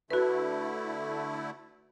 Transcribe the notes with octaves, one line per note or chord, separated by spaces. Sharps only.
D3 A3 E4 F#4 B4